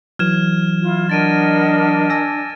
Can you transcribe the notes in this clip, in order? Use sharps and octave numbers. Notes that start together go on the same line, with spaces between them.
E3 F#3 F6 G#6 E7
E4 F4
D4 A#4 D#5 F#5 A6 D7 D#7
G#5 E6 A#6